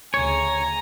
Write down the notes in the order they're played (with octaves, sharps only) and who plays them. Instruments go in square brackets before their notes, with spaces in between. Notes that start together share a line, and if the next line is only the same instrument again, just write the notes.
[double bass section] D2 C#3 [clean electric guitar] C#5 [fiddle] G#5 A#5